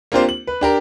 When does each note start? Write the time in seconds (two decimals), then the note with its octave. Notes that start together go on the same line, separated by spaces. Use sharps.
0.12 A#3 C4 D4 F4 G4 C5
0.29 F#7
0.47 B4
0.61 D4 G4 A#4